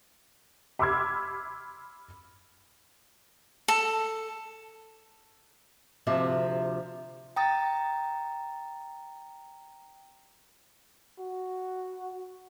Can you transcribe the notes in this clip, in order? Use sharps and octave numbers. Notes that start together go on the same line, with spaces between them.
B5 C6 D6 E6 F6 G#6
A4
D2 C3 F3 E5
G5 A#5 D#6 A6
F#4